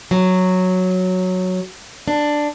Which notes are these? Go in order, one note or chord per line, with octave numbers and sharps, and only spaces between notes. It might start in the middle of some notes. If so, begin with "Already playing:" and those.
F#3
D4